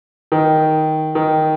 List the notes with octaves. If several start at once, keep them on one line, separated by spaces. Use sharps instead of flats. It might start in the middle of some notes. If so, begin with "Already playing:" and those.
D#3
D#3